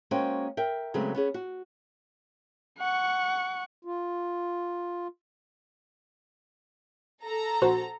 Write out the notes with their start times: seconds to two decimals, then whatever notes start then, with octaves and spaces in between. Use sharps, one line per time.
0.11 G#3 A#3 C#4 F#4 C5 G5
0.57 A#4 E5 G5
0.94 C#3 F#3 G#3 A3 B3 C4
1.15 B3 C#4 G#4
1.34 F#4
2.79 F#5 C#6
3.85 F4
7.24 A4 A#5
7.62 A#1 F#4 C5